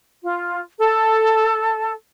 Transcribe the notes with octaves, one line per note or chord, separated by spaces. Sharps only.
F4
A4